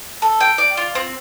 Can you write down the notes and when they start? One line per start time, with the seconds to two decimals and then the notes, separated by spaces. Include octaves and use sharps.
0.22 A4
0.40 G5
0.58 D5
0.77 F4
0.95 C4